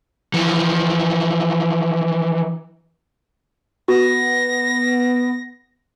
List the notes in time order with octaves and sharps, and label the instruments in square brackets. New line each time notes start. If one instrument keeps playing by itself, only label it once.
[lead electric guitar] E3 F3
[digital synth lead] B3 [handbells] F#4 [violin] A#6